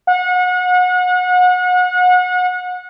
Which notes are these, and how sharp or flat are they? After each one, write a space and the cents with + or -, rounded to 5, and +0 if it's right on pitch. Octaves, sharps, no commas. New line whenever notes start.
F#5 -35